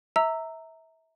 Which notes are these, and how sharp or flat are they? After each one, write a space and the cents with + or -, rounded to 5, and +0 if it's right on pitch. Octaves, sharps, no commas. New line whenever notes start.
E5 -25 A#5 -15 E6 +0